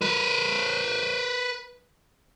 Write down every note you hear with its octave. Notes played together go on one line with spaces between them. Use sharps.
A#4 B4